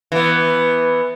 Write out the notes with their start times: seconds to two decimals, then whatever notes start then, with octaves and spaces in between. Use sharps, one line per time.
0.12 E3 B3